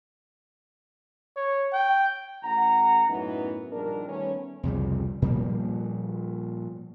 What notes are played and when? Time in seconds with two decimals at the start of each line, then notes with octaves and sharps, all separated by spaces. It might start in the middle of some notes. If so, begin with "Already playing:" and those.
1.36 C#5
1.73 G5
2.44 A1 F#5 A#5
3.08 F#2 A2 E3 F#3 B3 D#4
3.71 A#1 G2 D#3 D4 A#4
4.07 D#3 G3 A3 B3 C#4
4.63 C2 F2 C#3 G3
5.22 A#2 F3 G3 A#3